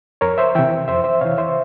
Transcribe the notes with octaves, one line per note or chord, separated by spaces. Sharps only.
F2 A#4 C#5
C5 E5
C3 E3 E5 G5
F2 C5 E5
C5 E5
C3 E3 C#5 F5
C5 E5